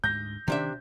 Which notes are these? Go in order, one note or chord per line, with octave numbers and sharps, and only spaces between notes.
D2 G#2 G6 A#6
C3 D#3 C#4 D4 E5